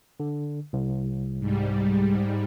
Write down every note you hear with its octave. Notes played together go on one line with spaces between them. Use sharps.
D3
C2
G#2 G3